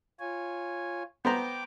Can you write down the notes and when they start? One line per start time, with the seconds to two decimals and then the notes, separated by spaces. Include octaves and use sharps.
0.20 F4 C#5 G#5
1.25 B3 C5 G5 A#5 D6